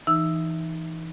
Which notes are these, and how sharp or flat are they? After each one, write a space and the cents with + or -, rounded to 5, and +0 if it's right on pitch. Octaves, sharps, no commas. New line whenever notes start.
E3 +0 D#4 +0 E6 +5